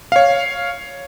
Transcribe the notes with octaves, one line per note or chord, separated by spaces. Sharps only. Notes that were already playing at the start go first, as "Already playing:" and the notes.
C#5 F5